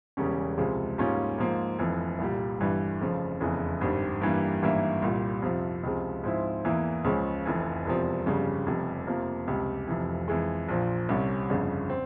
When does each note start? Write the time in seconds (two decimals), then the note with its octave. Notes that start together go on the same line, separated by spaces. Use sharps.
0.17 E1 E2 C#3 G3 C#4
0.58 C#2 C3 F3 G#3
0.98 G#2 G3 A#3 C#4 F4
1.38 G#2 F3 A#3
1.79 F1 F2 E3
2.19 C2 A#2 G3
2.60 G1 G2 E3 G3
3.01 F1 F2 C#3 F3
3.41 F1 E2 C#3 E3
3.81 G#1 G2 G3 C4
4.21 G2 E3 G3 A#3
4.62 G#1 G2 E3 A#3 E4
5.02 C2 A#2 G3
5.42 F2 C3 F3
5.83 C#2 C3 F3 G#3
6.24 G#2 F3 C4 E4
6.65 E2 E3 A#3 E4
7.04 C#2 C#3 F3 G#3 C#4
7.46 F1 F2 E3
7.85 E1 E2 C3 F3
8.26 G1 F2 C#3 G3
8.67 F1 F2 C3 G3
9.07 F2 C3 F3 A#3
9.47 C#2 C3 G3
9.87 F1 F2 C3 E3
10.28 F2 E3 G#3
10.69 A#1 A#2 F3
11.09 C2 C3 G3 C#4
11.50 G1 F2 C#3
11.90 C4